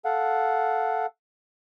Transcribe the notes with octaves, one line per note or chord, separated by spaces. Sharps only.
A4 F5 F#5